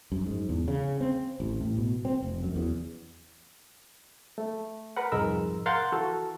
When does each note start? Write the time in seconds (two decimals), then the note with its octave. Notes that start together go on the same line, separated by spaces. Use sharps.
0.12 F#2
0.26 G#2
0.49 E2
0.68 C#3
1.01 C4
1.40 A1
1.61 A2
1.78 B2
2.05 C4
2.22 F1
2.43 F#2
2.56 E2
4.38 A3
4.97 A#4 B4 F#5
5.12 C2 F2 G#2 G#3 A#4 E6
5.66 A#4 F5 F#5 C6 G6 A6
5.92 E3 F#4 A4